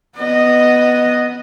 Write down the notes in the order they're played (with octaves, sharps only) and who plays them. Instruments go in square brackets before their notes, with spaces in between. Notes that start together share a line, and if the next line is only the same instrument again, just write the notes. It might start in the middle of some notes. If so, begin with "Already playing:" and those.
[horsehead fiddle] B3 D#5